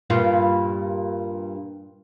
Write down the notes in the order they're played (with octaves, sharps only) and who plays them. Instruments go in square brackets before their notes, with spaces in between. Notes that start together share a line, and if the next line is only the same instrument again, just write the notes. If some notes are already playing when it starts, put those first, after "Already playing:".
[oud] G2 A#2 F4